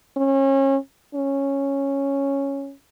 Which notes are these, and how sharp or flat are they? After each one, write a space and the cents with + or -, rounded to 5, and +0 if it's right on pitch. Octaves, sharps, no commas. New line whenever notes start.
C#4 -30
C#4 -5